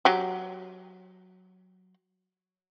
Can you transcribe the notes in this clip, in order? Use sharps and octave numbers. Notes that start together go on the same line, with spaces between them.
F#3 G4